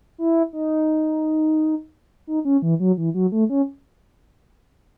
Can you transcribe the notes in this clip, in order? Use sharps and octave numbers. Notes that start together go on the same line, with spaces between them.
E4
D#4
D#4
C#4
E3
F#3
E3
F#3
A3
C#4